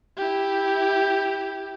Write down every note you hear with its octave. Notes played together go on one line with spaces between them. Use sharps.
E4 G4